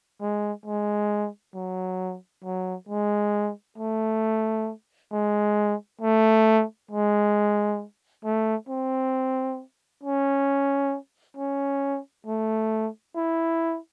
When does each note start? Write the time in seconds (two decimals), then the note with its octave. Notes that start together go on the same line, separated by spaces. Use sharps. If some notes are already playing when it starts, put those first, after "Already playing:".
0.21 G#3
0.66 G#3
1.54 F#3
2.44 F#3
2.89 G#3
3.78 A3
5.12 G#3
6.01 A3
6.91 G#3
8.24 A3
8.69 C4
10.03 C#4
11.37 C#4
12.26 A3
13.16 E4